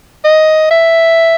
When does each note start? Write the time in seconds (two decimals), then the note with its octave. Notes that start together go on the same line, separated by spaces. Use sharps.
0.24 D#5
0.70 E5